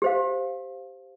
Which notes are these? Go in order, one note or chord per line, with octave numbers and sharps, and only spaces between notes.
G4 C5 F5